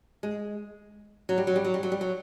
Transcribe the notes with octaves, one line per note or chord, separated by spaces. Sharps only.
G#3
F#3
G3
F#3
G3
F#3
G3
F#3
G3
F#3